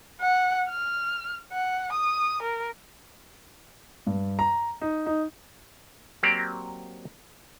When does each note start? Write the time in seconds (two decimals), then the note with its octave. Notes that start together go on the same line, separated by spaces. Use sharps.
0.21 F#5
0.70 F6
1.53 F#5
1.93 D#6
2.42 A#4
4.07 G2
4.39 A#5
4.82 D#4
5.06 D#4
6.23 F#3 A#3 C4 G4 D5